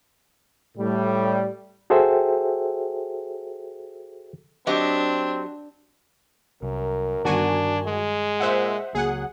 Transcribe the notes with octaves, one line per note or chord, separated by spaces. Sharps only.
A2 G3
F#4 G#4 A4 C5 E5 G5
F#3 C4 D4 G4 D#5
C2 F#2 A#4
G1 G2 D#3 D4 F#4 G#5
G#3
A#2 C5 E5 F#5
C#2 F#3 A#3 G#4 F#5